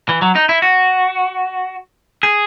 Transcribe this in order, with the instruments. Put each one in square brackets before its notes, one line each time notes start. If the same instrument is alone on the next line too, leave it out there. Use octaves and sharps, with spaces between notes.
[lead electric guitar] E3
F#3
D#4
E4
F#4
G#4